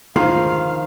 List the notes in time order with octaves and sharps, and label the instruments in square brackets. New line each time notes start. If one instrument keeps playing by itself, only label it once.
[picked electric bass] F1 D2 G#2 [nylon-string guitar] D#3 F3 [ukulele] F4 [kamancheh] F5